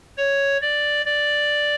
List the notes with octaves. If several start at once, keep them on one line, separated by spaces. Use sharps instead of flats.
C#5
D5
D5